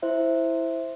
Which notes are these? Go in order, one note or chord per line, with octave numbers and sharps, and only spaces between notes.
E4 C5 E5